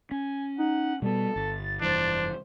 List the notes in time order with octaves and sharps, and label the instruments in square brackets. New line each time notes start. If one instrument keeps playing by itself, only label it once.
[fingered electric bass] C#4 [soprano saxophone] G#5
[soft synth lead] D#4 [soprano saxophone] F#5
[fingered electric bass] B2 B3 [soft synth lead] G3 [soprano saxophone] A4
[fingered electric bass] G1 [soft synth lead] A6
[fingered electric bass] F1 G2 E3 [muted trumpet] D4 [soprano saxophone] C5